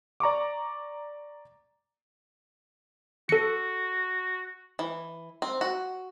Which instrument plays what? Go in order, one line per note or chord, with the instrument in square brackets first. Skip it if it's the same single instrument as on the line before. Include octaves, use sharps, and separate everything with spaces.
[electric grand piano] D5 A#5 C#6 D6
[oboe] F#4 [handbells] A4 C#7
[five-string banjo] E3
C4
F#4